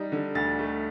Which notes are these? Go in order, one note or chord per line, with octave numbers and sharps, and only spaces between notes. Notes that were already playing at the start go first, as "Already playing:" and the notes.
Already playing: G3 D#4
D3
D2 A6
A3